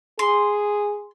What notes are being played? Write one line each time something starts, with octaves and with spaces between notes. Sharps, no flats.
G#4 C6